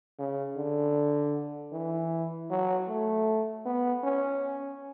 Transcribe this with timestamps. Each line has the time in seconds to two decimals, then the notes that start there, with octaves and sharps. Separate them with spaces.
0.19 C#3
0.56 D3
1.72 E3
2.50 F#3
2.88 A3
3.65 B3
4.03 C#4